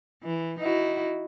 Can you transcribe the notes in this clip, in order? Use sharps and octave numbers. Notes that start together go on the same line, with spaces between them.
E3
D#4 E4 F#4